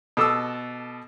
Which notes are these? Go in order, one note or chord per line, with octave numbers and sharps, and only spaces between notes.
B2 A4 D6 E6